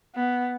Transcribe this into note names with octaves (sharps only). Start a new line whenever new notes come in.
B3